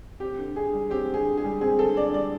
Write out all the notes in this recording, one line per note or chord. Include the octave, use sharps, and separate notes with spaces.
C4 G4
D3
D3 G#4
G3
C4 G4
D3 G#4
D3
G#4
G3
C4 G#4
D3 A4
D3 D5
G3 D5